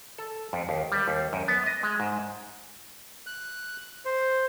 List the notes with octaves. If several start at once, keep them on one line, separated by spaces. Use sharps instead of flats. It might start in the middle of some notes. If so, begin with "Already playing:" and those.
A4
F2
D#2
G3
D#2
F#2
B3
D#5
G#3
G#2
F#6
C5